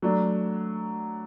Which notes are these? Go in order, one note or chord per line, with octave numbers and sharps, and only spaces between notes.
F#3 A3 D4